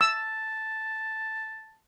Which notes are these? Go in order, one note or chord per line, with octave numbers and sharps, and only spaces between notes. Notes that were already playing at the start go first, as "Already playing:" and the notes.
A5 E6